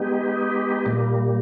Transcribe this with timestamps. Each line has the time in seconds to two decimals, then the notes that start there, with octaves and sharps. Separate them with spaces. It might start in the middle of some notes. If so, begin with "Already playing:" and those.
Already playing: G#3 B3 D#4 G4
0.86 A#2 G3 A#3